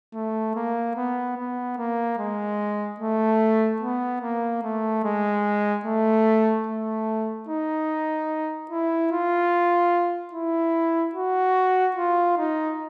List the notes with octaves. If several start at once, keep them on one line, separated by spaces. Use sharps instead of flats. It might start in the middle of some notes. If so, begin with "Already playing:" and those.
A3
A#3
B3
B3
A#3
G#3
A3
B3
A#3
A3
G#3
A3
A3
D#4
E4
F4
E4
F#4
F4
D#4